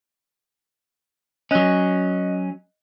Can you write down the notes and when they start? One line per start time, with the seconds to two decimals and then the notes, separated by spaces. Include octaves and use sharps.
1.51 F#3 C#4 D#5 F#6